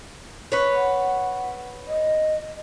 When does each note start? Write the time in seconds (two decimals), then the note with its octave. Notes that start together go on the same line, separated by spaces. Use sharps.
0.52 B4 C#5
0.75 F#5
1.88 D#5